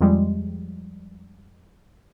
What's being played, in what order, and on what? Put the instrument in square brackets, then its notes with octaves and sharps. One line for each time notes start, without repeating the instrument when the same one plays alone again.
[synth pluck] F2 F3 G3 G#3